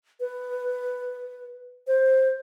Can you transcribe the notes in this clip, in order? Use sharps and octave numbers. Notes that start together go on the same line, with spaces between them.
B4
C5